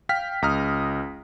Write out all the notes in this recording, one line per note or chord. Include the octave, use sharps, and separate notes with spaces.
F5 G5 F6 B6
C#2 A#5 D#6 F6